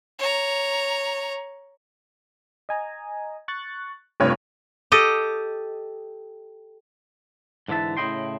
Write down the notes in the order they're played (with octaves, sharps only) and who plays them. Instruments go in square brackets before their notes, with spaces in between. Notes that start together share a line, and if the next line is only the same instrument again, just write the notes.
[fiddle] C#5 A#5
[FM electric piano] D#5 G#5 A#5
C#6 F#6 A6
[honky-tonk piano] F1 G2 C#5 [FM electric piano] A3 C4 F4
[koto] G4 A4 D#5
[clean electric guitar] G#2 D3 E3 E5 A5
A2 C#3 E4 D#5 G5 C6